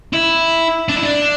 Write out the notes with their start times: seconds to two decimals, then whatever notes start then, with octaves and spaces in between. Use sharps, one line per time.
0.13 E4
0.89 D4
0.96 E4
1.03 D4